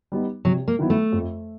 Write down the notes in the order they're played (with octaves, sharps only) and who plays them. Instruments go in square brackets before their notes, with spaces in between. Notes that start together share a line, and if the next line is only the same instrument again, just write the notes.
[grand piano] G3 B3 D#4
[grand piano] C3 [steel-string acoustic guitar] F#3
[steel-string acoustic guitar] A#3
[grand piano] D#3 F#3 B3 E4
[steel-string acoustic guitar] A3
[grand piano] F2